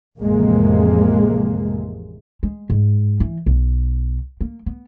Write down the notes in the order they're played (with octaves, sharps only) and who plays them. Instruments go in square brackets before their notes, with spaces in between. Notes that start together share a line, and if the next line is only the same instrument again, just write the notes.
[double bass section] A1 F2 C3 G#3 A#3
[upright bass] G#3
G#2
E3
B1
A#3
B3